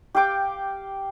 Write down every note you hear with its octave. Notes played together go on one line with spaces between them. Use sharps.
G4 F5 G5 D6